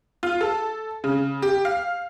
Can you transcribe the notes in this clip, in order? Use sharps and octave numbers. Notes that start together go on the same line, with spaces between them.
F4
A4
C#3
G4
F5